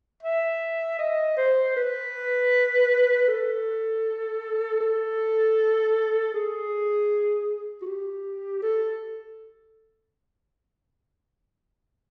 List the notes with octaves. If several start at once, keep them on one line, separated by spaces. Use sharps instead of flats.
E5
D#5
C5
B4
A4
A4
G#4
F#4
G4
A4